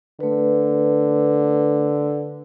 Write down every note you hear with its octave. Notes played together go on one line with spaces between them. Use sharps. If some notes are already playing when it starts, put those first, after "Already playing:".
D3 A3 B4